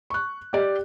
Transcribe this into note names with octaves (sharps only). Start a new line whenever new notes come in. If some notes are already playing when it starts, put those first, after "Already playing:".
C#6 F#6
G4 D5